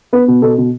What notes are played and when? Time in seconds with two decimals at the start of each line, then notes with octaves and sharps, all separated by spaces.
0.13 B3 B4
0.28 B2
0.42 B2 A4
0.58 B2